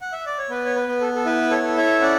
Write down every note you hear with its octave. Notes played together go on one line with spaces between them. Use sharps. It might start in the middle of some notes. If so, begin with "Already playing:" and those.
F#5
E5
D5
C#5
B3 B4
C#5
B4
B3
A4
A4
E4 B4
A4 C#5
A4
C#5 E5
C#4 D5 F#5